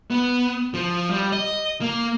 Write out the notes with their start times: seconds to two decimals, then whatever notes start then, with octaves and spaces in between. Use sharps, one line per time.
0.11 B3
0.74 F3
1.10 G3
1.32 D#5
1.81 A#3